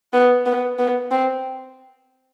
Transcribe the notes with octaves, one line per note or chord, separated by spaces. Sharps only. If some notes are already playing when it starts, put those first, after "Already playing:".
B3
B3
B3
C4